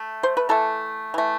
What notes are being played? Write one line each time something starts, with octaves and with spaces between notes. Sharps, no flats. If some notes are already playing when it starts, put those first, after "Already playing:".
Already playing: A3
C5
B4
E3 A3 A4
E3 A3